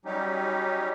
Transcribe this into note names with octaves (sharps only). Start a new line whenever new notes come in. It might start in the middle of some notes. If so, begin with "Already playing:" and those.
F#3 G3 C#4 D#4 G4